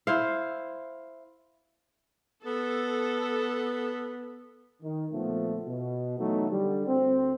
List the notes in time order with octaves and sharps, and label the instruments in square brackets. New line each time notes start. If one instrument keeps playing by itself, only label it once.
[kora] E4 C5 F5
[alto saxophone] B3 [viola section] A4
[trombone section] D#3
D2 A#2 F3 A3 B3
B2
E3 F#3 A3 B3 D#4
D3 G3
D2 C4